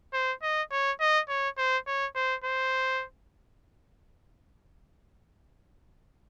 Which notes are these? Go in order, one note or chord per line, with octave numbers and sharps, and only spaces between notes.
C5
D#5
C#5
D#5
C#5
C5
C#5
C5
C5